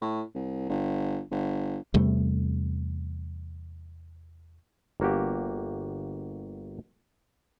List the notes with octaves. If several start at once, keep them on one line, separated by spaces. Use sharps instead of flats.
A2
C2
G1
G1
E2 C3 G3 A3
G1 A#3 F#4 G4